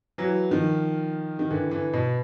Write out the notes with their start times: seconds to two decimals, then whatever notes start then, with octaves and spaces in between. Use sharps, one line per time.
0.18 E3 F#3
0.51 D#3 F3
1.39 D#3
1.51 D3 E3
1.71 D3 E3
1.93 B2